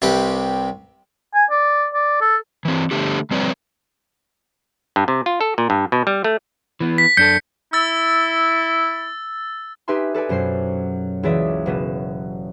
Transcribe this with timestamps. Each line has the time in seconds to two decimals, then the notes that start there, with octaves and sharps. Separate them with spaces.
0.02 C2 C3 G4 B4 D6
1.34 G#5
1.50 D5
1.94 D5
2.21 A4
2.65 E3 C4
2.91 D3 A3 G4
3.31 F3 G3 C4 B4 C#5 D5
4.96 G2
5.08 C3
5.26 F4
5.41 A4
5.58 A#2
5.70 G2
5.92 B2
6.07 G3
6.24 A3
6.80 E3 B3
6.98 B6
7.17 F#2 D4 A4 G6 B6 C#7
7.73 E4 E6 A6
9.88 D#4 G4 B4 E5 G#5 C6
10.14 A4 B4 D5 G#5
10.29 F#2 B2 F#3 C5 C7
11.23 C#2 E3 F#3 D5 E5 D#6
11.66 F#1 B2 B3 E7